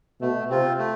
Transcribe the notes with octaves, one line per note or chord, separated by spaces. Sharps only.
B2 A3
C3 C4 F4
A3